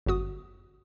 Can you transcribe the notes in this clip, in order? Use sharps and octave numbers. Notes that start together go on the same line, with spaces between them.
G1 F#2 F#4 D#6